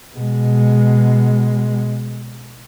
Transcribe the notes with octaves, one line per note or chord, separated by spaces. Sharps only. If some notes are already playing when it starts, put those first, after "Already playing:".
B2 G#3